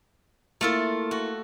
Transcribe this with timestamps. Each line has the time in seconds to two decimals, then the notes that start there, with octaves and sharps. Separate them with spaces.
0.61 A3 A#3 E4 F4 A4
1.11 F#4